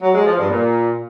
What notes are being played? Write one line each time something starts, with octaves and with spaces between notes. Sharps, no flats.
F#3
G#3
F3
G2
A#2